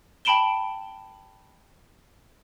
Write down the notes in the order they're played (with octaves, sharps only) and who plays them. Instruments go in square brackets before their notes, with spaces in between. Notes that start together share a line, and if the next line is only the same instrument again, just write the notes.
[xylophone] G5 A5 B5 D7 E7 G7